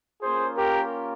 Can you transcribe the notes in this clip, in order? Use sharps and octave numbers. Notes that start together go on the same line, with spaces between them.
A#3 C#4 F4 G#4 C5
G4 A#4